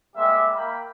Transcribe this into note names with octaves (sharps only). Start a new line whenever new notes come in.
G3 G#3 A#3 G4 E5
A#3 G5 B5